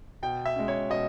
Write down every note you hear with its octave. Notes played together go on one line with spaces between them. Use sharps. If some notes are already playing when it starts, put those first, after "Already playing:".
B2 G5
E5
G#3 C#4
C#5
B2 D#5